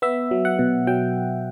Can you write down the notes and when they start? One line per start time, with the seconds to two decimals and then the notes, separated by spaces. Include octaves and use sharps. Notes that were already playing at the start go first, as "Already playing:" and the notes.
0.02 B3 E5
0.31 F#3
0.45 F#5
0.59 B2
0.87 F#3 G5